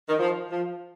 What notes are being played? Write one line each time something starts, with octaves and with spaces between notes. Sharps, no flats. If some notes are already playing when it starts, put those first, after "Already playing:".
D#3
F3
F3